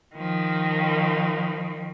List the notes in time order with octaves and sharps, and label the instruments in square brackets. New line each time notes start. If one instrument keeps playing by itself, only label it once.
[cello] D#3 F3